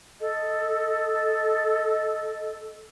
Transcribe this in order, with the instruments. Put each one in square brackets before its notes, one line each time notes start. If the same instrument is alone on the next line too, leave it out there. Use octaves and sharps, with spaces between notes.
[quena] A4 [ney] D#5